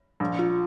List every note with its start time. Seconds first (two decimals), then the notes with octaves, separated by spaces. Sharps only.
0.20 A#1
0.39 F4